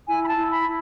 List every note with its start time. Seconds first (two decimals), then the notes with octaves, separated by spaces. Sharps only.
0.07 E4 G#5
0.23 B5
0.28 A5
0.36 E4
0.51 B5
0.66 E4